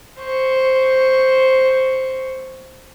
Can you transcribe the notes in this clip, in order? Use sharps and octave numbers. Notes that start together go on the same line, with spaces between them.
C5 C#6